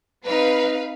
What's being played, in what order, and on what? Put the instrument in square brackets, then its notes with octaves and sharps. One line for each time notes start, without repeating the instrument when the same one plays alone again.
[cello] C4 D#4 [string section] B4 F5